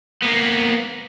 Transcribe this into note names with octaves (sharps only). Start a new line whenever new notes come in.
A#3 B3